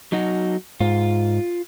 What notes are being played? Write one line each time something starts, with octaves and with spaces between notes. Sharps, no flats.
F#3 D#4 F#4
G#2 F4